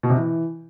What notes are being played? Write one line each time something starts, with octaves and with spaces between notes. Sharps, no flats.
B2
C3
E3